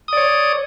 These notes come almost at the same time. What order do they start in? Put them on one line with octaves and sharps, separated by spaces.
D#6 D5 C#5